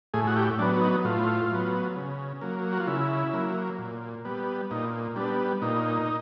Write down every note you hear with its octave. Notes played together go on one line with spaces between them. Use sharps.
A2 G#4
F#4
G4
F#3 B3 D4
D#4
A2 F4
F#3 B3
C#3
F#3 A#3
F#4
F4
C#3 E4
F#3 A#3
A#2
G3 B3
A#2 D#4
G3 B3 D4
A#2 D#4